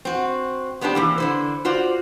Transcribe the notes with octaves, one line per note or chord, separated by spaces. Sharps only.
C4 F#4
G#3 B3 C4 D4 G4
C3 E3 A#3
D3 E4 C5
F4 F#4 C5 D5